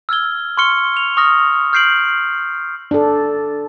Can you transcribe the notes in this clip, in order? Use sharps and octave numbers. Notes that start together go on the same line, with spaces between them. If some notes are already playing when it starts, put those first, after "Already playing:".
E6 F6 G#6 G7
C6 C#6 F6 C#7 G7
F7
C#6 D#6 F6 A#6
F6 G6 C7 D7 F#7
D4 A4